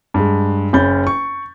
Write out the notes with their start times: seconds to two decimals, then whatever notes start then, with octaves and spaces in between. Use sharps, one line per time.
0.14 G2 G#3
0.73 F#1 C#4 B5 G6 A6
1.07 C#6